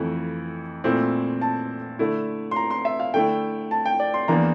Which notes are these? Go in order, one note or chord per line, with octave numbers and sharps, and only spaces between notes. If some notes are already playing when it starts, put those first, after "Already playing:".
Already playing: F2 E3 A3 E4
A#2 A3 C4 E4
A5
D3 A3 E4
C6
A#5
C6
E5
F5
D3 A3 E4 G5
A5
G5
D5
C6
E2 E3 A#3 D4 A#5